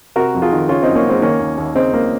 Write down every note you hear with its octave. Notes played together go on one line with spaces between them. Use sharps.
C3 F#4 A#4
F2
F4 G#4
D#3
C#3 C#4 F4
F#2 C4 D#4
A#3 C#4
F#2 G#3 C4
D#3 A#3 C#4
D#2
D#2
C#3 C4 D#4
C#2 A#3